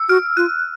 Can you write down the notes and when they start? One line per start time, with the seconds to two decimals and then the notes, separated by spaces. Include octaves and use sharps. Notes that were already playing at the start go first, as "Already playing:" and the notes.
Already playing: E6
0.09 F#4 F6
0.37 F4 F#6